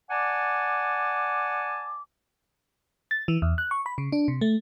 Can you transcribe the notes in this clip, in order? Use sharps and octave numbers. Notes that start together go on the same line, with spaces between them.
D5 F#5 G#5 A5 D6
A6
E3
E2
F#6
C#6
B5
C#3
D4
C3
A3